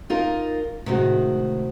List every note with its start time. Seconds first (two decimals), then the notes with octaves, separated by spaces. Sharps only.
0.10 D#4 F4 A#4
0.86 A2 C3 D#3 G#3 F#4